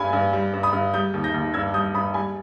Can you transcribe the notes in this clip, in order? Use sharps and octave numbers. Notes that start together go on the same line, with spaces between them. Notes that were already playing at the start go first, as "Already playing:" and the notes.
Already playing: G2 G3 G#5 B5
G2
G3
G2
B5 D#6
G2
G3 D#6 G6
D#2
G6 A#6
D#2
G2 E6 G#6
G3 D#6 G6
G2 B5 D#6
G3 G#5 B5